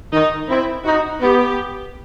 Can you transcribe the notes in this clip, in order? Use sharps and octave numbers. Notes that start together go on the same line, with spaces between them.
D#3 D#4
C4 E4
D#4 F#4
B3 G4